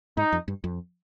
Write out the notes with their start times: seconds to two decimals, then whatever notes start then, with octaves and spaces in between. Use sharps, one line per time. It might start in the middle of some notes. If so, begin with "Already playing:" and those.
0.17 G#2 D#4
0.32 F2
0.48 G2
0.64 F2